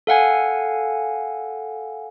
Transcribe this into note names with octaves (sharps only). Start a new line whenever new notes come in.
A4 F5 F#5 G#5